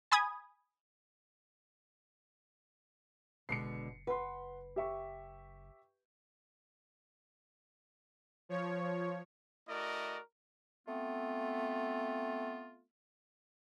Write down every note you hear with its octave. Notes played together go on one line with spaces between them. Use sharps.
G#5 B5 D#6 G#6
F#1 B2 D3 G#3 C7 C#7
B4 F#5 C6
G4 E5 C#6
F3 C#5
A3 E4 F#4 A#4 D5 D#5
A3 B3 C4 F4